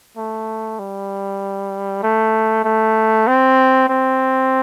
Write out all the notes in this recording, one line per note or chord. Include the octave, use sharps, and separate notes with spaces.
A3
G3
A3
A3
C4
C4